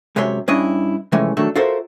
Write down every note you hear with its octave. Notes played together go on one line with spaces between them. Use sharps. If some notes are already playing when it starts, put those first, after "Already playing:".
F#2 C3 G#3 C#5 E5 C6
G2 G3 C#4 D4 E4 D#5
C3 E3 F3 G#3 A3 C#4
D#3 F#3 A3 D4 A4
F4 F#4 A4 A#4 C5 E5